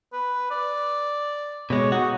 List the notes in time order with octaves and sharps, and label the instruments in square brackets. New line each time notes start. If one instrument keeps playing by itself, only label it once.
[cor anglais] B4
D5
[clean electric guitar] B2 G#3 [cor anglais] C#5
[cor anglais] D#4 [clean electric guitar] F#4